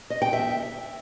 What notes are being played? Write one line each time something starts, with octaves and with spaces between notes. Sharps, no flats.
D#5
G5
E5